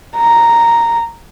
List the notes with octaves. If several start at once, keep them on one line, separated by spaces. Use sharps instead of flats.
A#5